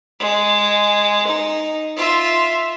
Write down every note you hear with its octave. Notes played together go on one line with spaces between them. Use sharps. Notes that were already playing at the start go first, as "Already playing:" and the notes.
G#3
D#4
F4 E5